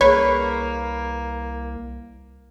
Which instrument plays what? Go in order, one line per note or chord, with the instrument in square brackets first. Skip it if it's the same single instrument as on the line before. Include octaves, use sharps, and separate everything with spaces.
[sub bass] C2 [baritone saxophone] A#3 [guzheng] B4 [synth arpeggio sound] C#5